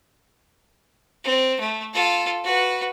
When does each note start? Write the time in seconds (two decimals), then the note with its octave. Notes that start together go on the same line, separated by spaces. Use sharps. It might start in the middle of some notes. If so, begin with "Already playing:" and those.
1.24 C4
1.60 A3
1.93 F4 A4
2.44 F#4 B4